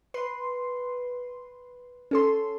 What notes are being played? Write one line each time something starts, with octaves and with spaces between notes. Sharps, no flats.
B4 C6
C#4 A4 C6